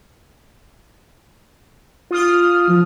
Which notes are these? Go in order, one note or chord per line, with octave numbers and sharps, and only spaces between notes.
F4 D#6 F6
F3